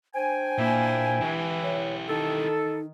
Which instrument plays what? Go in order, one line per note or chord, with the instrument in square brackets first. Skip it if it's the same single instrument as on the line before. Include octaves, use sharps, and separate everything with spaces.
[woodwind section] D4 G5 G#5 [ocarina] C5
[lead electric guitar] A#2 [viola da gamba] A#3 E4
[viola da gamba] E3 [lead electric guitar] E4 G4
[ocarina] C#5
[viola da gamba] D#3 [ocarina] D#4 [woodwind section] A4